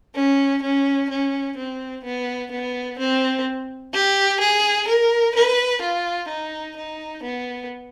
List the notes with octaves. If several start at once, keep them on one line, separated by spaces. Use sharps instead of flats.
C#4
C#4
C#4
C4
B3
B3
C4
G4
G#4
A#4
B4
F4
D#4
D#4
B3